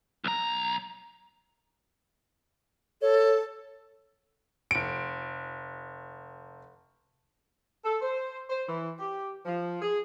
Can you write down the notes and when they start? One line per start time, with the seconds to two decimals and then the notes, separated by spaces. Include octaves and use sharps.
0.24 B1 A#5
3.02 A4 C#5
4.71 F1 D7
7.85 A4
8.02 C5
8.50 C5
8.68 E3
9.00 G4
9.46 F3
9.82 G#4